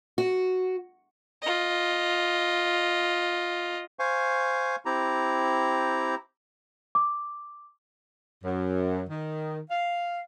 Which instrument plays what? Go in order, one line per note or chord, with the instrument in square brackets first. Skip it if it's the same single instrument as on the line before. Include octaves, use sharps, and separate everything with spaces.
[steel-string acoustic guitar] F#4
[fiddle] F4 D#5
[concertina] C5 F5 G#5 C#6
C4 E4 G4 A#5
[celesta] D6
[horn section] F#2
D#3
F5